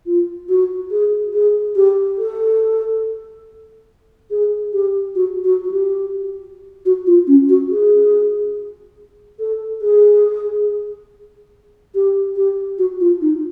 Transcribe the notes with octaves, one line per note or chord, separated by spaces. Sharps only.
F4
F#4
G#4
G#4
G4
A4
G#4
G4
F#4
F#4
F#4
G4
F#4
F4
C#4
F#4
G#4
A4
G#4
G4
G4
F#4
F4
D#4